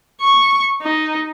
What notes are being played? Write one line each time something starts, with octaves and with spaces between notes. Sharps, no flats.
C#6
D#4